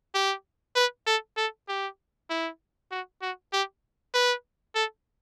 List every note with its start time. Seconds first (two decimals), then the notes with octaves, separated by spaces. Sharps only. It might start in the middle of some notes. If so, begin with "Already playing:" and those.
0.15 G4
0.76 B4
1.07 A4
1.37 A4
1.68 G4
2.30 E4
2.91 F#4
3.22 F#4
3.53 G4
4.14 B4
4.75 A4